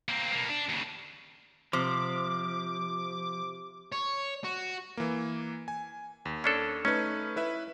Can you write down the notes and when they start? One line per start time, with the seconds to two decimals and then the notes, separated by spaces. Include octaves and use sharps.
0.09 A#3 C4
0.33 B2 A#3
0.49 D4
0.69 D#2 C#3
1.73 C3 F3 D6
3.92 C#5
4.44 F#4
4.97 E3 A#3
5.68 G#5
6.25 D#2
6.44 C#4 D4 A4
6.85 A3 C#4 D#4 B4
7.36 E4 B4 E5